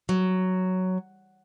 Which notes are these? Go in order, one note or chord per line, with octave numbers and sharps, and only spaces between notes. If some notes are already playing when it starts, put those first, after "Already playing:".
F#3